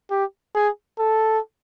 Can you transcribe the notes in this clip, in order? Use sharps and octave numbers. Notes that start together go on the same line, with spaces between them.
G4
G#4
A4